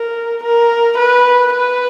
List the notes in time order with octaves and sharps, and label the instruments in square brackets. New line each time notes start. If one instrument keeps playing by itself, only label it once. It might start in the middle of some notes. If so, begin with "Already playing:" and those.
Already playing: [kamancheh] A#4
A#4
B4
B4